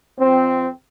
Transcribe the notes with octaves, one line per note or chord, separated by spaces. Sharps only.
F2 C4